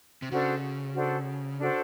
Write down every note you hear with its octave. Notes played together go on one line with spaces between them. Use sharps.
C3
C#3 D4 F#4 A4 C5
D4 F#4 A4 C5
D4 F#4 A4 C5